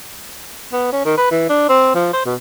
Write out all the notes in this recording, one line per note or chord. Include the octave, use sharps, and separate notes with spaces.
B3
C#4
D#3
B4
E3
D4
C4
F3
C5
B2